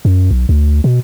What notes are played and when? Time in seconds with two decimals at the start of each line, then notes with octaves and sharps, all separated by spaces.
0.05 F#2
0.31 B1
0.49 D2
0.84 B2